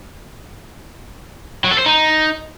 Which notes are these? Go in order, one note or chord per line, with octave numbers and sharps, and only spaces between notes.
F#3
A4
C5
D#4